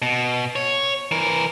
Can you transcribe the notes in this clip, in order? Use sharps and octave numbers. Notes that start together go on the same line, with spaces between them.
B2
C#5
E3 A#4